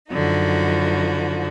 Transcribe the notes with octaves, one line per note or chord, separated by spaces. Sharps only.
F#2 D3 F3 D#4 F#4